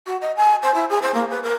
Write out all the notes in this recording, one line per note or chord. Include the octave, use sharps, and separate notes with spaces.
F#4
D#5
G#5
C5
E4
G#4
C5
A#3
B4
A#4